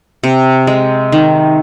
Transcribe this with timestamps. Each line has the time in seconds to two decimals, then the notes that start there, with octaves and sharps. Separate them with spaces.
0.24 C3
0.67 G#3
1.12 D#3